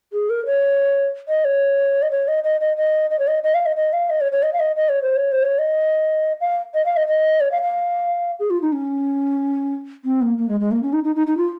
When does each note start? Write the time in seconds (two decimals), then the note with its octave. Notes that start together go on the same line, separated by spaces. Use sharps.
0.13 G#4
0.30 A#4
0.46 C#5
1.28 D#5
1.45 C#5
2.02 D#5
2.11 C#5
2.28 D#5
2.44 D#5
2.61 D#5
2.77 D#5
3.10 D#5
3.19 C#5
3.28 D#5
3.44 D#5
3.55 F5
3.66 D#5
3.76 D#5
3.93 F5
4.10 D#5
4.21 C#5
4.32 C#5
4.43 D#5
4.53 F5
4.60 D#5
4.76 D#5
4.89 C#5
5.02 C5
5.16 C#5
5.32 C5
5.43 C#5
5.59 D#5
6.41 F5
6.74 D#5
6.86 F5
6.97 D#5
7.08 D#5
7.41 C#5
7.52 F5
7.62 F5
8.40 G#4
8.50 F4
8.62 D#4
8.73 C#4
10.05 C4
10.22 A#3
10.38 A#3
10.49 G#3
10.60 G#3
10.71 A#3
10.82 C#4
10.93 D#4
11.04 D#4
11.16 D#4
11.27 D#4
11.37 F4